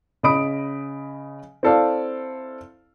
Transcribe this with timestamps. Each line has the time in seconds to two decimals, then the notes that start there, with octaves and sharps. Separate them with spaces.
0.23 C#3 D#5 B5 D#6 D7
1.63 C4 E4 A4 D5 F5